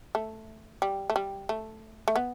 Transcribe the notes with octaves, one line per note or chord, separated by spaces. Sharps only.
A3
G3
A3
G3
A3
A3
B3